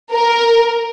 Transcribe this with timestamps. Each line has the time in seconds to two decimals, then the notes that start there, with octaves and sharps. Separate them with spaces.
0.12 A#4